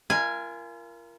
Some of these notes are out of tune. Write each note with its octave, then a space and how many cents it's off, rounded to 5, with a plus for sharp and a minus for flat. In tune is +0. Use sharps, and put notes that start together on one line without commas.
F4 -35 A#4 +10 G#5 +0